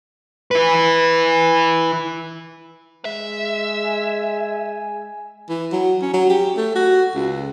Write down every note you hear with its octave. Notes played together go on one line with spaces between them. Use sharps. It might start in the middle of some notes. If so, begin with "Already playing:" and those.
E4 B4
G#3 E5
G#5
E3
F#3
C#4
F#3
G4
A3
F#4
C#2